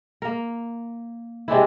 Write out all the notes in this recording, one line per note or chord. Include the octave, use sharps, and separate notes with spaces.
A#3 A#4
C3 G#3 D4 E4